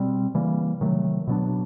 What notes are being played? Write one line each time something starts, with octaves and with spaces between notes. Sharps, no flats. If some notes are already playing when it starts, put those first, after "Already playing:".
Already playing: B2 G3 C4
C#3 E3 G3 A#3
C3 D#3 F#3 A3
B2 F#3 B3 D4